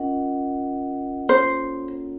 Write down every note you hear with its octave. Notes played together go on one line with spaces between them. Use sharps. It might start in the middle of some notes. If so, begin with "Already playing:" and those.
Already playing: C#4 F4 A#4 D#5 F#5
A#3 C#4 F4 A4 C5 C#5